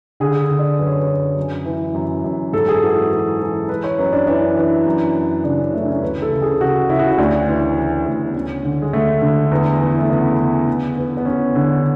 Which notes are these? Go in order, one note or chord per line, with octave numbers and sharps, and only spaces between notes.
D3 G#4
D3
D5
F#2 B4
C#5
B4
F#2
F#2
E3
F#2
F#2
G#2 A4
G#4
E3 F#4
E3 F#4
E3 G#4
E3 B4
C#5
F#2 B4
D4
E3 D4
E3
F#2
F#2
C#3 D4
C#4
E3 A3
D4
C#4
D2 B4
A4
C#3
G#4
C#3 F#4
C#3 E4
F#4
E4
D2 D4
E3
C#3
D2
B3
D2 C#4
D3
G#3
D3 A3
D3
E2
E3
A3
C#3 B3
C#3
D3
E2
B3
E2 C#4
D3